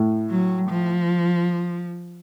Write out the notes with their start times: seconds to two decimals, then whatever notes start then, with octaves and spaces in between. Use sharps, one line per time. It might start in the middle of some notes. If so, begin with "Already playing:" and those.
Already playing: A2
0.30 F#3
0.70 F3